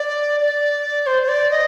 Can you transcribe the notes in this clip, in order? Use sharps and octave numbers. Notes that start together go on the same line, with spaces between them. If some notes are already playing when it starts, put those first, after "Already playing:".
Already playing: D5
D5
C5
C5
D5
D#5